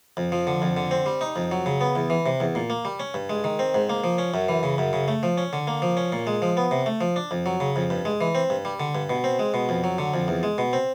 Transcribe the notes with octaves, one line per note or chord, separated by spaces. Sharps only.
F2
F3
D3
F2
D3
C4
G3
D#4
F2
F#3
C#3
B3
E2
E3
C3
E2
A#2
A#3
G3
C#4
G2
G#3
D#3
C4
G#2
A#3
F3
C#4
F#2
E3
C#3
F#2
C#3
A3
F3
C#4
D3
A#3
F3
C#4
A#2
G#3
F3
B3
C3
A3
F3
D4
F2
F#3
C#3
F2
G2
G#3
E3
C4
G2
G3
D3
G2
B2
C4
G#3
B2
F2
F#3
D3
F2
E2
G#3
B2
C4